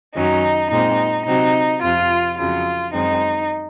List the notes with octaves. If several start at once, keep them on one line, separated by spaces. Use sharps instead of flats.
F#2 D#3 F#3 C#4 D#4
A#2 G#3 C4 D#4
C3 F#3 C4 D#4
F2 C3 F3 F4
F2 C#3 F#3 F4
F#2 D#3 G#3 C4 D#4